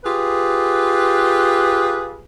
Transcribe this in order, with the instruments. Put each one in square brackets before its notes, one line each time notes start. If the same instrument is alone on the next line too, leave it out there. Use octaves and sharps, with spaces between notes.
[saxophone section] F4 G4 G#4 B4